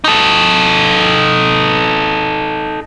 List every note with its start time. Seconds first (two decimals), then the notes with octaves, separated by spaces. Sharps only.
0.04 D#4 A4